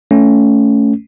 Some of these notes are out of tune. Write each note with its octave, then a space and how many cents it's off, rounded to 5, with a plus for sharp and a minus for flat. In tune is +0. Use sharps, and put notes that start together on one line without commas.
A3 +0 C#4 +10